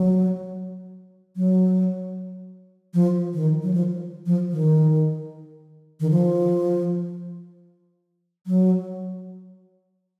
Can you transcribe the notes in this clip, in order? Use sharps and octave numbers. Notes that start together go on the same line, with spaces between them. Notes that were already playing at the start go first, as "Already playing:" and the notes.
Already playing: F#3
F#3
F3
D#3
F#3
F3
F3
D#3
D#3
F3
F#3